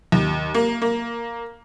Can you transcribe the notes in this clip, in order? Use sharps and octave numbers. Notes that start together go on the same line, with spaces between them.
D#2
A#3
A#3